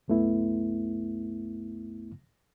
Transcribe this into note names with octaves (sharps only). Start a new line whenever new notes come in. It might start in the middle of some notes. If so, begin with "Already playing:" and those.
C2 F#2 A3 B3 E4